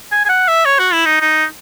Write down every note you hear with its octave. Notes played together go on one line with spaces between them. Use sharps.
G#5
G#5
F#5
E5
C#5
F#4
E4
D#4
D#4